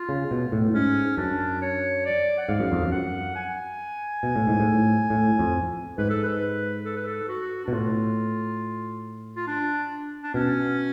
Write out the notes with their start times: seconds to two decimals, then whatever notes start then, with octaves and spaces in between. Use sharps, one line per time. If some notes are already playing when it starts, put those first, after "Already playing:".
Already playing: F4
0.09 C#3
0.31 B2
0.52 A2
0.74 G#2 C#4
1.17 F#2 D4
1.62 C#5
2.05 D5
2.38 F#5
2.48 G#2 F5
2.59 F#2
2.72 F2
2.82 F#2
2.92 F#5
3.36 G#5
4.23 B2
4.36 A2
4.47 G#2
4.60 A2
5.10 A2
5.39 F2
5.98 G#2 B4
6.10 A4
6.23 B4
6.85 A4
6.96 B4
7.07 A4
7.28 F#4
7.65 B2 D4
7.72 A2 F4
9.36 F4
9.47 D4
10.23 D4
10.34 B2 C#4